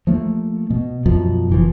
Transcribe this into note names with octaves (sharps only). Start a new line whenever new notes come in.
F3 A3 A#3
B2
F#2 B2 F3
F#1 E3 F3